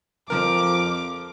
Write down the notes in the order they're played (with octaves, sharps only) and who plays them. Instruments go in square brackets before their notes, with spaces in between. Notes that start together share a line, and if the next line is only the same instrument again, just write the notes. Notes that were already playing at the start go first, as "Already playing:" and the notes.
[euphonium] F2 [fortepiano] F3 A#4 [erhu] D6